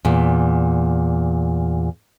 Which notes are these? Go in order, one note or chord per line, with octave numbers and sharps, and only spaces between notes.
E2 A#2